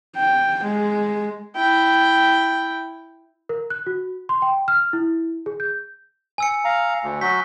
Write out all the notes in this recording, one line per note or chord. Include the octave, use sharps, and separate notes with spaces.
G5
G#3
E4 G5
A#4
F#6
F#4
C6
G5
F6
E4
G#4
G6
G#5 E6 C#7
F5 A#5
D2
F#3 F#4 G6 B6